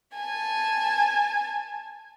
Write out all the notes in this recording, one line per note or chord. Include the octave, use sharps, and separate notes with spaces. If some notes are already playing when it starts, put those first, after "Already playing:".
G#5 A5